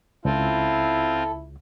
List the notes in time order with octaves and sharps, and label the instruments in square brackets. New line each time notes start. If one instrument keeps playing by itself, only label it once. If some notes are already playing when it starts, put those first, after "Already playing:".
[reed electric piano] C#2 [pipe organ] C4 F4 [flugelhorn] E4 [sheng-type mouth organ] A4